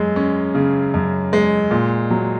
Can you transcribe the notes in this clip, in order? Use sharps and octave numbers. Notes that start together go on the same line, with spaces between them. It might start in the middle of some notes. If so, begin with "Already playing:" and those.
Already playing: F#2 G#3
C#4
C#3
F#2
G#3
A#2
F#3